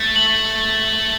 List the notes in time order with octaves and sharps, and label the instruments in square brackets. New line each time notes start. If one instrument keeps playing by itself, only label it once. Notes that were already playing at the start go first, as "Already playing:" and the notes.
Already playing: [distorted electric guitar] A3
[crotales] F#7